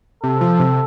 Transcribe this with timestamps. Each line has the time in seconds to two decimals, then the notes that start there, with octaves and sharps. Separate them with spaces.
0.23 C3 A4
0.41 F3
0.60 C3